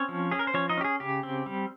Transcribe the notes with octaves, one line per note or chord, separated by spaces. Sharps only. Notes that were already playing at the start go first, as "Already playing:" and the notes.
Already playing: C4 C#4 C#5
F3
C#4 G#4
A#4
C5
F3 C#4 C#5
D#4 D#5
C#4 G4
G#4
C#3 G4
C4
G3